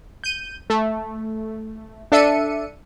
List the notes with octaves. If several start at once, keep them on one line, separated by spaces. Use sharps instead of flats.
G6 D#7
A3
D4 A4 E5 C#7 D#7